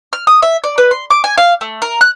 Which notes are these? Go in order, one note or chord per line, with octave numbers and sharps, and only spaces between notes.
F6
D#6
E5
D5
B4
C6
D6
G#5
F5
A3
A#4
F#6